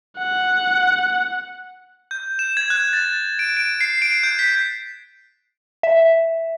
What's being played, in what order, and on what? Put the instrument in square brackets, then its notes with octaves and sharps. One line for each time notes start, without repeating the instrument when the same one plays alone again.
[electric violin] F#5
[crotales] G6
E7
G#6
F#6
A6
D7
D7
C7
D7
G6
B6
[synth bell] E5